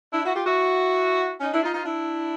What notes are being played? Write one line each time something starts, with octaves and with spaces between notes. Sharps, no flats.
D4 E4
E4 F#4
F4 G4
E4 F#4
C#4 D#4
D4 E4
D#4 F4
D#4 F4
D4 E4